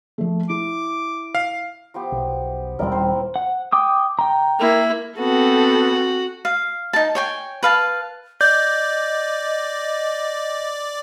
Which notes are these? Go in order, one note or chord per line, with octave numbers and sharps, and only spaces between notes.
F3 A3
E4 D6
F5
F3 B3 G4
B1
D#1 G3 C4 E4 A#4
C5
F#5
G5 D6 D#6
G5 A#5
A#3 E4
B3 C4 F#4 A4
F5
D#4 A5
C#5 G5 G#5
B4 F5 A5
D5 D#5 G6